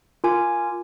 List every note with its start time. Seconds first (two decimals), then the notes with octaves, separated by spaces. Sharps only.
0.24 F4 A#4 G#5 D6